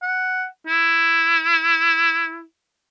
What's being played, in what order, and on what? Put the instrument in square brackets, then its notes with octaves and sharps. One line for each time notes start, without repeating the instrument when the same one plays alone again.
[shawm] F#5
E4